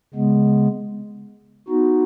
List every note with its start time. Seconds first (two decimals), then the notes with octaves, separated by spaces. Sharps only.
0.14 C#3 G#3 B3
1.68 B3 D#4 F#4